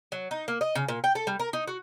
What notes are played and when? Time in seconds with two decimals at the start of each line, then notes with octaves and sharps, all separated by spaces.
0.12 F#3
0.31 D#4
0.48 A#3
0.61 D#5
0.75 C#3
0.88 A#2
1.04 G5
1.15 A4
1.27 G3
1.40 A#4
1.53 D#4
1.67 F#4